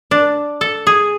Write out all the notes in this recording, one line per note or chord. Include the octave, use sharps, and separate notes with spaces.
D4
A4
G#4